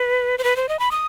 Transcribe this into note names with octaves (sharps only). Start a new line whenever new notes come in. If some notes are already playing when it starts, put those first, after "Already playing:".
Already playing: B4
C5
B4
C5
D#5
B5
D#6